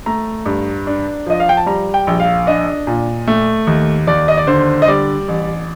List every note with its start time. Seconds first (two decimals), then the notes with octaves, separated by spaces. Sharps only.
0.06 A3 A#5
0.46 G2
0.87 D4
1.26 F3 D#5
1.40 F5
1.49 G5
1.57 A5
1.66 G3 A#5
1.94 G5
2.07 A#1
2.20 F5
2.47 D4 D#5
2.87 A#2
3.27 A3
3.67 D#2
4.07 D#2 D5
4.28 D#5
4.37 D5
4.47 D3 C5
4.82 D#5
4.88 G3 D5
5.28 A1